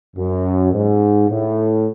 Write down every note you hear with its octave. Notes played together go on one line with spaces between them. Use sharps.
F#2
G#2
A2